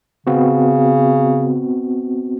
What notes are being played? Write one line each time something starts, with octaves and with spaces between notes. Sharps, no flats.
C#3 B3 C4 F#4